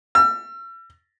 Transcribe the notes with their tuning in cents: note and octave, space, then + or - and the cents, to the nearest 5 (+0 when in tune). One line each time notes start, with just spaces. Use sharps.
E6 +40